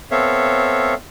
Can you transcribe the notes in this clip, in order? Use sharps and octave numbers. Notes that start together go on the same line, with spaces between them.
B3 C4 A4 C#5 E5 F5